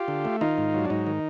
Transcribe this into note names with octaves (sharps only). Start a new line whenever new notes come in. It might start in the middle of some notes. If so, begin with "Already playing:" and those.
Already playing: F4 G4
D3
A3
D#3 D#4 F4
G#2
F#3
D4
G#2 D#4
D#3